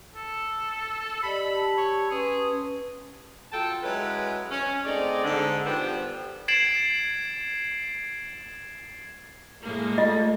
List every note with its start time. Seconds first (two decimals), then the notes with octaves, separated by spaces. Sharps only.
0.16 A4
1.23 G4 D5 D#5 B5
1.52 G4 A5 E6
1.78 C#5
2.11 C#4 G#4 B4 C6
3.52 F#3 F4 A4 G5 A5
3.83 F#3 G#3 C#4 E4 B4
4.51 C#4
4.85 A3 C4 D#4 G#4 D5
5.24 G#2 D3
5.66 F3 G3 B3 G4 B4 C5
6.48 G#6 A6 C7 D7 E7 F#7
9.63 A2 G#3 A#3
9.98 A3 F4 A4 D#5